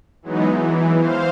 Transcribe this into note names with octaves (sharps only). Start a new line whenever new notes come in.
E3 F#3 G#3 B3 D#4
E3
C5 F5